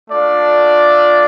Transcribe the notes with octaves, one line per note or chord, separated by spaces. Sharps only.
A3 D4 F4 D5